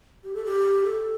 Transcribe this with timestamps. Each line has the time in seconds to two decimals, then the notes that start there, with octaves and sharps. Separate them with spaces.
0.24 G4
0.34 A4
0.45 G4
0.85 A4